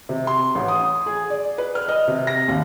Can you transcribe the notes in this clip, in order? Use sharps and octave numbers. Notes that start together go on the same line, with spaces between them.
C3
C6
A1
D#6
G#4
D5
B4
F6
D#5
C3
A#6
D#2